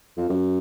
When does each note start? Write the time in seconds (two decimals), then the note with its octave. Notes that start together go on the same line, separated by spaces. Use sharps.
0.17 F2
0.29 F#2